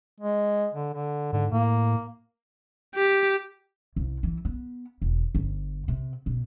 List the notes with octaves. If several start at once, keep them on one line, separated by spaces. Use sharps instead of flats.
G#3
D3
D3
G#2 D3
A2 A#3
G4
C2
E3
B3
E1
G1
C3
B2